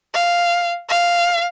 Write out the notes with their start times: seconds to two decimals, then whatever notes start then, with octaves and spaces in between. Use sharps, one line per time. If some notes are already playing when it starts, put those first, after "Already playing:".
0.14 F5
0.89 F5